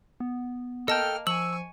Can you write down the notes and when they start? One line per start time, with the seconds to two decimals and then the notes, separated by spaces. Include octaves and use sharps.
0.20 B3
0.88 A#3 A4 D#5 G5 A5 F6
1.27 F3 G#5 C#6 E6 F#7